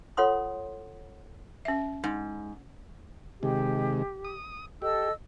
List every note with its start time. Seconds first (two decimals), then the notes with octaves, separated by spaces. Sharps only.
0.17 F4 A4 C#5 F#5 C6 D#6
1.65 C#4 E5
2.04 G#2
3.43 C3 D#3 G#3 G4
4.25 D#6
4.82 G4 A4 D#5 E6